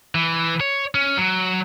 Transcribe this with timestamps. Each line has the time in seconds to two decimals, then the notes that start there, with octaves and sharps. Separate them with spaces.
0.15 E3
0.61 C#5
0.95 C#4
1.17 F#3